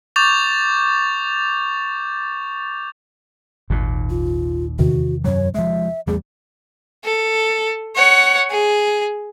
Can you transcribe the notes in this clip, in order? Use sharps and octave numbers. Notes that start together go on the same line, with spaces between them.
C#6 D6 G6 A6 F7
G#1 D#2 A#2
F4
E2 C3 D#3 F#4
F#2 F#3 C#5
F3 G#3 E5
E2 G3 A3 G#4
A4
C#5 F#5
G#4